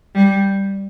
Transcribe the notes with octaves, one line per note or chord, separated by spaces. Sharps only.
G3